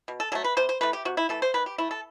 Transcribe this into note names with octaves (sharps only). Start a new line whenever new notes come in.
B2
A4
F#3 A3 A4
B4
C3 C5
C5
E3 A3 B4
G4
C3 F#4
E4
E3 A3 A4
C5
D#3 B4
G4
A3 E4
A4